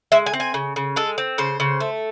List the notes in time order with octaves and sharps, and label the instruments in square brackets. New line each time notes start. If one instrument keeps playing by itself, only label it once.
[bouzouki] G#3 E5
G#5
C4
G#5
C#3
C#3
G#3 A4
C4
C#3 C5
C#3
A3